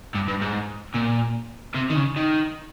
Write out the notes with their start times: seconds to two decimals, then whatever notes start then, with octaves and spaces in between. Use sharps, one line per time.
0.14 G2
0.28 G2
0.41 G#2
0.95 A#2
1.75 C3
1.90 D#3
1.96 C#3
2.16 D#3